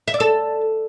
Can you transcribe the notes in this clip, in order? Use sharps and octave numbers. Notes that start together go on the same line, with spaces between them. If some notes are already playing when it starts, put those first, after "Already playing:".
E5
D5
A4